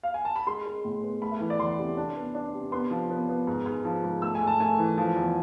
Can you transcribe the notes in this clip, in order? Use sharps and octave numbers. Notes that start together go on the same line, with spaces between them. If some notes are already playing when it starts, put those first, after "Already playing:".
F5
G#5
A5
B5
G#3 C6
G#3
A2
B3
A3 B5
E5
E3
D5
E2 C6
C3
D4
B3
D4
C3
B3 C6
F3
B3
B3
G#2
G#2
F3
G#2
A3 E6
G#5
G#2
A5
A3 G#5
E3
F3
E2